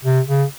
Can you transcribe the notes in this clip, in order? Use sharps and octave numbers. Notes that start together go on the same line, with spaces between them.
C3
C#3